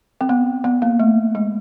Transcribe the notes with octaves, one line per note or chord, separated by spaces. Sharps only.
C4
B3
B3
A#3
A3
G#3